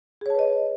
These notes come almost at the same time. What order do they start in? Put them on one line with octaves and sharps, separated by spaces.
G#4 C#5 A5 B4 D#5